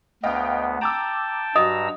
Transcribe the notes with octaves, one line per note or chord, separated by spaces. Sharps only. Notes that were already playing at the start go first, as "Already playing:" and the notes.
D2 B3 D#5 F5 G5
G5 A5 A#5 D6 E6
G2 F#3 D#5 A#5 D#6 E6